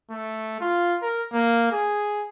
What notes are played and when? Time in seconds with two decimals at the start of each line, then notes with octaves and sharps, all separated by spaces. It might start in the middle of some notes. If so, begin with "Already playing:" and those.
0.10 A3
0.61 F4
1.02 A#4
1.32 A#3
1.72 G#4